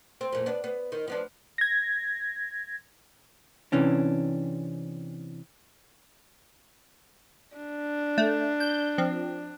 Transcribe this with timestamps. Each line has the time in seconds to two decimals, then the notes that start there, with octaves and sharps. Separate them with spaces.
0.21 C4
0.32 F2 A#2
0.46 B3 D4
0.64 B3
0.92 D#3
1.08 F3 B3 D4
1.58 G#6 A#6
3.72 C3 E3 C#4 D4
7.57 D4
8.18 A3
8.60 G6
8.98 F3 C4